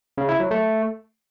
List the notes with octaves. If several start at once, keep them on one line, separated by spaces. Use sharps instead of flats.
C#3
E4
F#3
A3